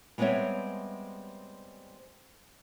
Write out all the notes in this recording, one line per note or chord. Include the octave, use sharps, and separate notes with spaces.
G3 G#3 B3 C4 C#5 E5